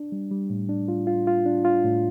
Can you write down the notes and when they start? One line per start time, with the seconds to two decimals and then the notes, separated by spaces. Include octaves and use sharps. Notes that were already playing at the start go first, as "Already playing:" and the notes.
Already playing: D4
0.12 G3
0.31 G3
0.50 A2
0.69 D4
0.88 F4
1.07 F4
1.27 F4
1.46 D4
1.65 F4
1.84 A2